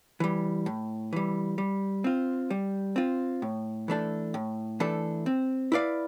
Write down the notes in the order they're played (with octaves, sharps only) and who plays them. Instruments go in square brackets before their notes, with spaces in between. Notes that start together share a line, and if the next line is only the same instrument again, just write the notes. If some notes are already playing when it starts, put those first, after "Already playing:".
[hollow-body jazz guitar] E3 G3
A2
E3 G3
G3
C4 F4
G3
C4 F4
A2
E3 A3 D4 A4
A2
E3 A3 D4 A4
C4
E4 B4 D5 F5